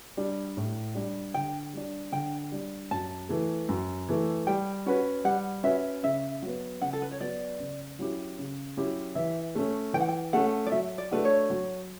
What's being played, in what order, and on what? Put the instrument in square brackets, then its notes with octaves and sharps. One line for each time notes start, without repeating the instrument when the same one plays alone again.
[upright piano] G3 D4
A2
G3 D4
[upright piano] D3 [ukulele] G5
[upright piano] G3 D4
[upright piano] D3 [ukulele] G5
[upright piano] G3 D4
[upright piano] F#2 [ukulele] A5
[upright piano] E3 A3
F#2
E3 A3
[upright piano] G3 [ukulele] G5
[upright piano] C#4 F#4 B4
[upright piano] G3 [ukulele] F#5
[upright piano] C#4 F#4 B4 [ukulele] E5
[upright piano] C#3 [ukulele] E5
[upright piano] F#3 B3
[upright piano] C#3 [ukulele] F#5
[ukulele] A4
B4
C#5
[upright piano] F#3 B3 [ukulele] D5
[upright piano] C#3
F#3 C#4 E4 G4
C#3
F#3 C#4 E4 G4
[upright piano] E3 [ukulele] E5
[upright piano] A3 C#4
[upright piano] E3 [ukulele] G5
[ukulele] F#5
G5
[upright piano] A3 C#4 [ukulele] F#5
[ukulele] D5
[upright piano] F#3 [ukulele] E5
[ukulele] D5
[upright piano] A3 D4 F#4 [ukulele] B4
[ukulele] C#5
[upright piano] F#3